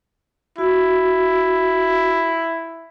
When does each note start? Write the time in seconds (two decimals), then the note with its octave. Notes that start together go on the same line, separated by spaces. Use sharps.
0.58 E4 F#4